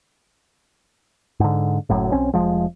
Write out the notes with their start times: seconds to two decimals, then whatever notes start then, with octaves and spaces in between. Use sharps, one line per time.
1.40 G#2 D3
1.90 F#1 F#2 A2
2.12 B1 C4 C#4
2.34 F1 D2 F3 G#3